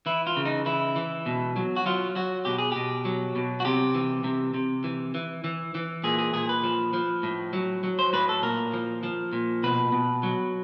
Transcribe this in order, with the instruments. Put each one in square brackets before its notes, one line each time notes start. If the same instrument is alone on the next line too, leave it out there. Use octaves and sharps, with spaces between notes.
[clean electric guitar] E3 E4
F4
C#3
D#4
E3 E4
E3
B2
F#3
F#4
F#3 F4
F#3 F#4
B2 G4
G#4
B2 G4
F#3
B2
F#4
C3 G4
E3
C3
C3
E3
E3
E3
E3
A#2 G#4
G#4
A#2 G#4
B4
F3
F3
A2
F#3
F#3
C5
A2 B4
A4
A#2 A#4
F3
F3
A#2
B2 B4
B2
F#3